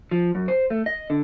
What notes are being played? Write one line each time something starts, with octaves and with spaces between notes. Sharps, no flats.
F3
F#2
C5
A3
D#5
D3